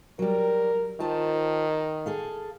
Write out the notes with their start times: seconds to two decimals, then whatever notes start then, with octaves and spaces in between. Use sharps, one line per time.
0.19 F#3 G3 A#4
1.00 D#3 F4 C5 A5
2.06 G#4 A4 F5